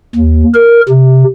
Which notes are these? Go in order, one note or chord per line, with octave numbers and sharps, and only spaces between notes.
D#2
A#4
C3